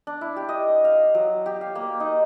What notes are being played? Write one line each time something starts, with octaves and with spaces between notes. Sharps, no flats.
D4
E4
G4
D#5
F5
F#3
G4
F5
A#3
D#4